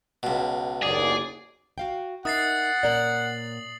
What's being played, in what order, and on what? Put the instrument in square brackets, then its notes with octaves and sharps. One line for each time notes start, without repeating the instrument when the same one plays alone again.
[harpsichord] C#2 B2
[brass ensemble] F#1 D#2 D5 [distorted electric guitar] G#4
[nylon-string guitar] F#4 F5 G5
[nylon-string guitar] D#4 A#4 E5 [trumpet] F#5 [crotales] D#6 A6 C7
[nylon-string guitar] A#2 C#4 A#4 [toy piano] D5 [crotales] A6 F#7